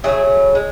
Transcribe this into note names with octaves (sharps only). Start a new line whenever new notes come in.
C#3 F#3 A3 E4 G#4
G#3